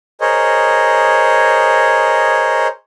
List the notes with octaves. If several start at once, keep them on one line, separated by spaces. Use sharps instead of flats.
G#4 A#4 C5 C#5 D#5